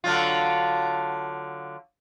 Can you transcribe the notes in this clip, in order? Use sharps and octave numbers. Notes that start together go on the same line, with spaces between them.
D3 F#3 F4